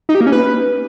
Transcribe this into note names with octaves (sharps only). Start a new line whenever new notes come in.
D#4
G4
A#3
C#4
B4